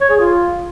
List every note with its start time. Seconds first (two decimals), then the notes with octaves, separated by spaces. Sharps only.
0.01 C#5
0.10 G#4
0.20 F4